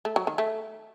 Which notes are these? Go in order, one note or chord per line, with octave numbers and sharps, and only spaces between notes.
A3
F#3
D#3
A3